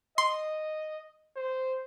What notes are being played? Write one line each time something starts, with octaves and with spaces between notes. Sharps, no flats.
D#5 C6
C5